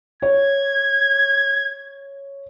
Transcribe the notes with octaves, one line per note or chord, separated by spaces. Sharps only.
C#5 G#6